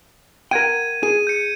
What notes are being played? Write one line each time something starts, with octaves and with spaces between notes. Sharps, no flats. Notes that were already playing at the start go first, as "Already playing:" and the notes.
A#4 F#5 G5 G#6 D#7
G#4 D#7
G6 C#7